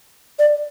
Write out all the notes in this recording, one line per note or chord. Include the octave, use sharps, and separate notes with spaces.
D5